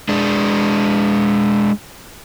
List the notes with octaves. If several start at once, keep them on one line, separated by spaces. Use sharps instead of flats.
G#3 D4